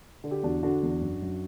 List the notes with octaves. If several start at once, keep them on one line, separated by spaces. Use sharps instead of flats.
D3
G4
E2 D4 F#4
D3 D4 F#4
E2
F#2
F#2